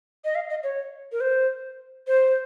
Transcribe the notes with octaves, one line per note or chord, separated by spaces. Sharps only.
D#5
F5
D#5
C#5
A#4
C5
C5